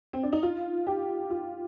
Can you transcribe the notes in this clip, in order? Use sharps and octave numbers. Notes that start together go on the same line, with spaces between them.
C4
D4
D#4
F4
G4
F4